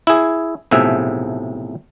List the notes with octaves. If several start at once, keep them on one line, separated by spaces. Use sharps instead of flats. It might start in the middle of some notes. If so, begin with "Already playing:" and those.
E4 G#4
B1 A2 C3 F3 G#4 E5